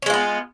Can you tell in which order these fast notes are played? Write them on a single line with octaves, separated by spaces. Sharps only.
C#4 G#3 F4 B3